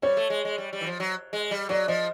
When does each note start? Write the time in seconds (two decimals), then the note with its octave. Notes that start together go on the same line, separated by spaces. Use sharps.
0.02 G3 C#5
0.17 A3
0.30 G#3
0.45 G#3
0.58 G3
0.73 G3
0.81 E3
0.86 F3
1.00 F#3
1.33 G#3
1.51 G3
1.69 F#3 D5
1.88 F3 D#5